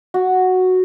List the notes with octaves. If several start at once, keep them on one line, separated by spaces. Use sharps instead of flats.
F#4